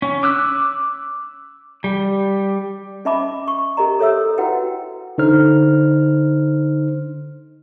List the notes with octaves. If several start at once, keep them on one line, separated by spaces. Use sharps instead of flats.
C#4
D6 E6 F#6
G3
C#4 D#5 E5 A5 B5 D6
E5
C#6
G4 A#4 D#5 A#5
A4 C#5 E5 E6
E4 F#4 B4 F#5 G5
D3 D#4 C5 F6